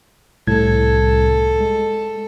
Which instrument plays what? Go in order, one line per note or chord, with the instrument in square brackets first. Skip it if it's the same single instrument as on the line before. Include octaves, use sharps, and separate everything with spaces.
[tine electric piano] C2 A2 G#6 [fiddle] A4
[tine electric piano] G#3